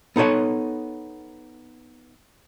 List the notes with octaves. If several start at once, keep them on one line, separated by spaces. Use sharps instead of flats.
B3 D#4 A4 C#5 F#5